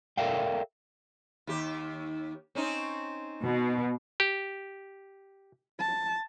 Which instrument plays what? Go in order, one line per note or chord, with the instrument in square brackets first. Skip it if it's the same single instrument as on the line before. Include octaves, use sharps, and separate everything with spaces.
[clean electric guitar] A4 A#4 D5 E5 F5 G5
[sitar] D#2 G4
C4 C#4 D#4
[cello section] B2
[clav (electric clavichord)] G4
[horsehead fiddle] A5